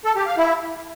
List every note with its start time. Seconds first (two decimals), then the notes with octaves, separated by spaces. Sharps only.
0.05 A4
0.16 G4
0.26 F5
0.37 E4